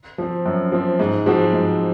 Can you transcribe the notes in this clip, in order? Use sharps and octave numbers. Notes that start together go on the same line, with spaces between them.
F3 C4
F#2
F3 C4
G#2
F3 G#3 C4 F#4
G#2